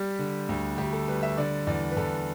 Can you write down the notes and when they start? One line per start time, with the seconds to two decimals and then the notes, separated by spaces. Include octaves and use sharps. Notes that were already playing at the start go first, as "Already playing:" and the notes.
Already playing: G3 G4
0.19 D3
0.49 D2
0.78 D2 G4
0.93 A4
1.08 G3 B4
1.23 E5
1.37 D3 D5
1.67 E2 D5
1.91 B4
1.97 E2 A4